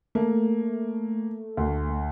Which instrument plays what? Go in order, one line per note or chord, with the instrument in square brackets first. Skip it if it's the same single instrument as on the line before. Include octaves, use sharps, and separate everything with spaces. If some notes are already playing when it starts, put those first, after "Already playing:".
[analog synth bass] A3 [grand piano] A#3
[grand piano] D2